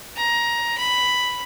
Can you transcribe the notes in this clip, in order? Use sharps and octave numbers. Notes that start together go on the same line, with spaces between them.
A#5
B5